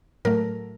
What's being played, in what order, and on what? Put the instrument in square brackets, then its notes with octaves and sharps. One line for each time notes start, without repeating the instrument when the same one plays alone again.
[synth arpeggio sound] A2 F#3 A3 A#4